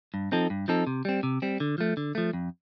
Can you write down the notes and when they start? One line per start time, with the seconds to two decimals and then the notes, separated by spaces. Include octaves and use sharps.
0.14 G2
0.32 F3 C4 D#4 A4
0.50 G2
0.68 F3 C4 D#4 A4
0.87 C3
1.05 G3 C4
1.23 C3
1.42 G3 C4
1.60 D3
1.78 F3 A3
1.97 D3
2.15 F3 A3
2.33 F2